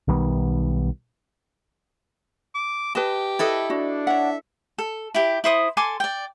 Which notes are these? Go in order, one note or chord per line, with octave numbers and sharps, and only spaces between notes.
B1 D#3 G3 B3
D6
G4 B4 D#5 A5
E4 A4 B4 D#5
D4 F#4
C#5 E5 F#5
A4
E4 G4
E4 C5 D#6
A4 G#5 C6 D6
D5 G5